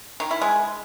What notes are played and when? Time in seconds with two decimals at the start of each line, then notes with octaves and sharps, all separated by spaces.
0.20 D#3
0.31 E4
0.42 G#3